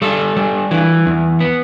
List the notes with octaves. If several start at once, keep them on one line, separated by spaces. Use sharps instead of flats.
G3 A4
G3
E3
E2
B3